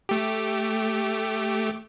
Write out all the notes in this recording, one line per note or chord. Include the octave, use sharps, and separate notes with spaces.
A3 G4